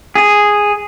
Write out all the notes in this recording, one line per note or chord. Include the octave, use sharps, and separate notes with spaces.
G#4